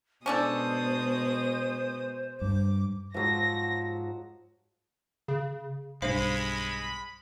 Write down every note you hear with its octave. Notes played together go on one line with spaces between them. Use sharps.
B2 G#3 C#4 D4 A4 C5 D#6
G2 D6
G#2 F3 F#3 A#6
C#3
B1 G2 G#3 C5 F5 B5